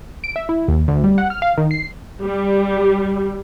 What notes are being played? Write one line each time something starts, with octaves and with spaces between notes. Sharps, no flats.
D7
E5
E4
D#2
D2
G3
F#5
F6
F5
D#3
C7
G3